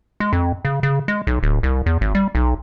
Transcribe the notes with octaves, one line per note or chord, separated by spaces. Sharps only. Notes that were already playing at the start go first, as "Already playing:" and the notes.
G#3
F2
C#3
C#3
G#3
B1
D1
C2
E2
G#1
G3
B1